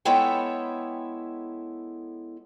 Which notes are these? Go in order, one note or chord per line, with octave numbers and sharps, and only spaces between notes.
G#3 B3 E4 A4 C#5 G5